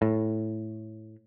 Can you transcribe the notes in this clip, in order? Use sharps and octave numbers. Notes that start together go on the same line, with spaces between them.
A2